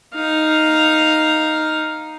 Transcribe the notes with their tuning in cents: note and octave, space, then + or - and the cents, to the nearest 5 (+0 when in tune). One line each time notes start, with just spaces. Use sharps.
D#4 +0 F5 +0